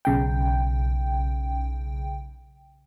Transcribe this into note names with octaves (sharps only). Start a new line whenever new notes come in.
B1 C#3 G5